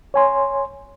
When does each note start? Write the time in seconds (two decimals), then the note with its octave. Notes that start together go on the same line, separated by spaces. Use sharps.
0.14 C#5 G#5 C6